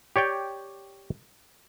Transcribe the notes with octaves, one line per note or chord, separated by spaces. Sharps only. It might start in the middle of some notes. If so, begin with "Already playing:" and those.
G4 C#5 D5 G5